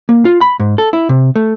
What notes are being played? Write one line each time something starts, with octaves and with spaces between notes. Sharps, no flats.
A#3
F4
B5
G#2
A4
E4
C3
A3